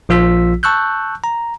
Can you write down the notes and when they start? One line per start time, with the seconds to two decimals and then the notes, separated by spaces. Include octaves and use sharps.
0.09 A#1 F3 F4 E6 B6
0.63 A5 C#6 E6 F#6 G6
1.24 A#5